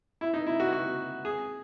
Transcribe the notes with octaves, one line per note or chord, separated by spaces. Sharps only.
E4
D#4
E4
F#4
F#4
G#4